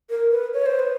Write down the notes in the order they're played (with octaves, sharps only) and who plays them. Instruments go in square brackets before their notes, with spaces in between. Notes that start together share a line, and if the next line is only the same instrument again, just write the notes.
[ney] A#4
B4
C#5
C5
B4